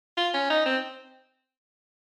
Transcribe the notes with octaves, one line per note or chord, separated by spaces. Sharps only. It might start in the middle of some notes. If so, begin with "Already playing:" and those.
F4
C#4
D#4
C4